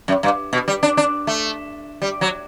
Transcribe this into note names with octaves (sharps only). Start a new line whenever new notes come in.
F#2
G2
B2
G3
D4
D4
A3
G3
F#3